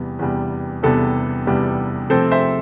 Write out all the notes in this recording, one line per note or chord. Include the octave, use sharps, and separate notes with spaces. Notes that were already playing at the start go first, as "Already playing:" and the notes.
Already playing: E2 C3 G3 B3
E2 C3 G3 B3
E2 C3 G3 B3 A4
E2 C3 G3 B3
C3 F3 A3 C4 A4 C5
C5 E5